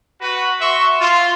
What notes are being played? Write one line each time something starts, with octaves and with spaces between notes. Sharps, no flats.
F#4 B4
F#4 E5 C6 C#6
F4